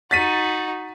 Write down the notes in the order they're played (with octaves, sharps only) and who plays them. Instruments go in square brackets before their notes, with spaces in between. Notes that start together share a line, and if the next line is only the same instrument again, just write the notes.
[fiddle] D#4 F#4 [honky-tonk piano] A6 B6 D#7